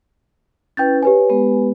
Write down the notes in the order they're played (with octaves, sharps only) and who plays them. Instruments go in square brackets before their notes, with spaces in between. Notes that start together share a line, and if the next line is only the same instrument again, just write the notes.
[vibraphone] C#4 E4 B4 [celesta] G5 G6 A6
[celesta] G4 B4 G#5 [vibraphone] C#5
[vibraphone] G#3 B3